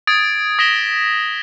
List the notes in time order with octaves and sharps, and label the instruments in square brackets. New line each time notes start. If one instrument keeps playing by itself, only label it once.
[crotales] D#6 G#6 A6 D7
D#6 A#6 B6 D7 E7 G7